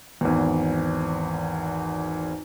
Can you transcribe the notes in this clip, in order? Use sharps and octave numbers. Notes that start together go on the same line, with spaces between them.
G#1 E2